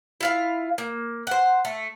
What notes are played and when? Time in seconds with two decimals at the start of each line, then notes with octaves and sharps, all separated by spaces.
0.21 E4 F4 F5
0.78 A#3
1.27 C5 F#5
1.65 A3